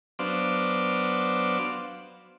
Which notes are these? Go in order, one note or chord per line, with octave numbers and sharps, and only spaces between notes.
F#3 B3 D4 C5 F5 D6